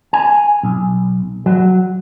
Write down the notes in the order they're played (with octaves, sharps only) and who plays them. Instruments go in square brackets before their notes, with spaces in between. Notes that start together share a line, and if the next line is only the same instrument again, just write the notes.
[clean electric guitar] G#5
B1
F#3